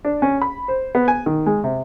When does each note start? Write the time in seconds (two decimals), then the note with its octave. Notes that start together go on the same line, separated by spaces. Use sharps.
0.05 D4
0.22 C#4
0.42 B5
0.68 C5
0.95 B3
1.08 G#5
1.26 D#3
1.46 G#3
1.64 C3